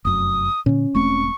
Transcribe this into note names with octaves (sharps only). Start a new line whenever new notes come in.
F1 F#2 D#6
A#2 D3 C#4
E1 A3 C4 C#6